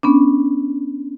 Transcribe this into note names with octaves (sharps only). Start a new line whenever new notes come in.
B3 C#4 D4